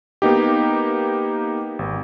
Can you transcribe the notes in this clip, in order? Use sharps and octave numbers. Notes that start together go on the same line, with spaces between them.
A#3 B3 D#4 G4
G#1